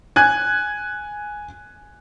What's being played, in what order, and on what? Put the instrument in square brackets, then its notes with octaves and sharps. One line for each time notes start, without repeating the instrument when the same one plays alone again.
[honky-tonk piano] G#5 F#6 G#6